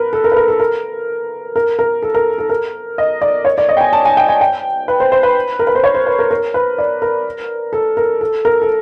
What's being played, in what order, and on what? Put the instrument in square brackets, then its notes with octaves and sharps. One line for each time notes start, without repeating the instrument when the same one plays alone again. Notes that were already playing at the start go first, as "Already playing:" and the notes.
Already playing: [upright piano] A#4 B4
A4
A#4
B4
A#4
A4
A#4
A#4
A#4
A4
A#4
A4
A#4
D#5
D5
C#5
D5
D#5
G5
G#5
A5
G#5
G5
G#5
G5
B4
C5
C5
B4
A#4
B4
C5
C#5
C5
B4
A#4
A#4
B4
D5
A#4
A4
A#4
A4
A#4
A4